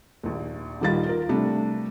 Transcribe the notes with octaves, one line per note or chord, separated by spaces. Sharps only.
A#1 D#2
D#1 D#3 G3 F4 A6
F4 A#4
C3 G3 A3 D4